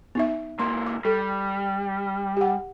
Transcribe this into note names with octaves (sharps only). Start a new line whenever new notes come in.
B3 D#4 E5
C#2 A#3 C6
D6
G3 A4
G4 F#5